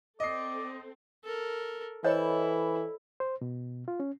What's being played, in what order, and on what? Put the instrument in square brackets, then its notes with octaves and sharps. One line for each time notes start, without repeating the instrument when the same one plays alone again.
[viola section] C4 A4 [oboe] D5 [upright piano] D#5 C7
[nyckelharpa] A4 A#4
[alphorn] E3 [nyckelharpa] E4 [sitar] A4 [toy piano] C5 C#5 D#5
[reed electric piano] C5
B2
F4
C#4